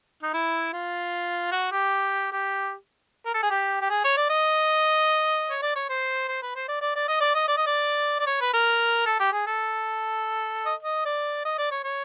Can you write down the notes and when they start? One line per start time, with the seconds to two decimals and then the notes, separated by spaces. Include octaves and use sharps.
0.23 D#4
0.34 E4
0.73 F4
1.52 F#4
1.72 G4
2.32 G4
3.26 A#4
3.34 A4
3.43 G#4
3.51 G4
3.82 G4
3.90 G#4
4.04 C#5
4.17 D5
4.30 D#5
5.50 C#5
5.62 D5
5.75 C#5
5.89 C5
6.28 C5
6.42 B4
6.55 C5
6.68 D5
6.82 D5
6.95 D5
7.08 D#5
7.21 D5
7.35 D#5
7.48 D5
7.57 D#5
7.67 D5
8.20 D5
8.27 C#5
8.41 B4
8.54 A#4
9.06 A4
9.20 G4
9.33 G#4
9.47 A4
10.66 D#5
10.83 D#5
11.06 D5
11.45 D#5
11.59 D5
11.71 C#5
11.84 C#5